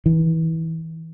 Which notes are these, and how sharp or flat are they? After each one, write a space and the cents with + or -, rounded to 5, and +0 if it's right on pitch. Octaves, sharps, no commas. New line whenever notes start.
E3 -25